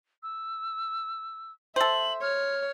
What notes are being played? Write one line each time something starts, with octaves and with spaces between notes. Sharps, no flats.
E6
A4 C5 E5 F#7
C#5 F6